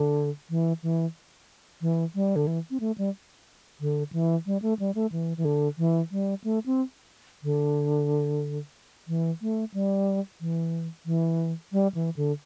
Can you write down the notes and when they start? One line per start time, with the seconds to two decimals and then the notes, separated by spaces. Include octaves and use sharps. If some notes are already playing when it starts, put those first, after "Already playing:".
Already playing: D3
0.50 E3
0.83 E3
1.81 E3
2.15 G3
2.36 D3
2.47 E3
2.70 C4
2.80 A3
2.98 G3
3.80 D3
4.13 E3
4.46 G3
4.62 A3
4.79 G3
4.95 A3
5.12 E3
5.37 E3
5.45 D3
5.78 E3
6.11 G3
6.44 A3
6.66 C4
7.43 D3
9.08 E3
9.42 A3
9.74 G3
10.41 E3
11.06 E3
11.72 G3
11.95 E3
12.16 D3